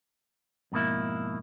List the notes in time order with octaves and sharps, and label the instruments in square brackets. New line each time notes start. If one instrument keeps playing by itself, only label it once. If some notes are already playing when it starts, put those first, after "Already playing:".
[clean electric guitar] F2 G#2 B2 A#3 E4